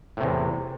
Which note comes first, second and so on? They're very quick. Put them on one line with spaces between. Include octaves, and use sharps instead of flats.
A2 C3 E2